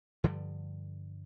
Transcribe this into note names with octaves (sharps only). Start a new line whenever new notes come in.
G2 D3 F3 G3